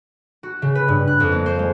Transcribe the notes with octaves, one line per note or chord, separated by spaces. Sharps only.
F#4
C#3
B4
G2
F#6
F2
A#3
C5
G#3